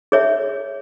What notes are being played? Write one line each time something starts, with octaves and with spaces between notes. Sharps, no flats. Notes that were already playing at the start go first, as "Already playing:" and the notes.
G#4 C#5 E5